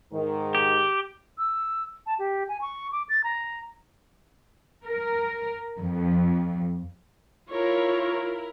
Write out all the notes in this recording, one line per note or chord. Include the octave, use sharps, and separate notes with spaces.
G#2 D#3
G4
E6
A5
G4
G#5
C#6
D6
A6
A#5
A#4
F2
E4 F4 A#4 C#5